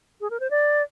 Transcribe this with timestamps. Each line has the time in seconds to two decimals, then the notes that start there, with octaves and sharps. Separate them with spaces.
0.21 G#4
0.30 A#4
0.40 C5
0.51 D5